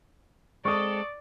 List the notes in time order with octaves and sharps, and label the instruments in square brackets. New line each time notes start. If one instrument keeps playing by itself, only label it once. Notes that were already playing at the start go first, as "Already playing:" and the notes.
[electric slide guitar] G#3 [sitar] C4 A4 [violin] D5 [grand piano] C#6 D#6